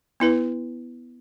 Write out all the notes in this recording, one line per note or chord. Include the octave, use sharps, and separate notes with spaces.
B3 E4 B4